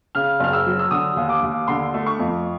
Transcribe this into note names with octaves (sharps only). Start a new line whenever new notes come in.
C#3 F6
F#1 F6
E6
F#3
E6
D3 D#6
D#2
D6
D#2
D3 C6
A3
C#6
F2